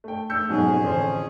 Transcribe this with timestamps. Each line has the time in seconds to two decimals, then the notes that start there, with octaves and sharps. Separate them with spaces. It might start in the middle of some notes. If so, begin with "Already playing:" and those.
0.04 A3 G5
0.30 A3 E6 G6 C#7
0.49 F2 G#2 B2 F#3 C#4 G#4
0.83 A1 D3 C5